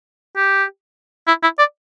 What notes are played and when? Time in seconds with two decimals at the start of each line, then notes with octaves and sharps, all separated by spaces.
0.36 G4
1.28 E4
1.43 E4
1.59 D5